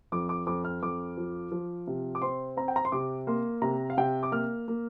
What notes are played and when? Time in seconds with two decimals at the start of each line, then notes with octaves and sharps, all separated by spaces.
0.12 F2 D6
0.29 D6
0.47 F2 D6
0.64 F6
0.82 F2 D6
1.17 F3
1.52 F3
1.87 C3
2.15 D6
2.22 C4 C6
2.57 C4 A#5
2.68 G5
2.76 A#5
2.85 C6
2.92 C3 D6
3.27 A#3 C6
3.62 C3 A#5
3.90 F5
3.97 C3 G5
4.23 D6
4.32 A#3 F6
4.68 A#3